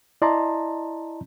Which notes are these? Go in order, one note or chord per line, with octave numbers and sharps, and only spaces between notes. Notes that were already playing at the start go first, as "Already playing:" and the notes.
E4 D5 D#5 A5 A#5 C6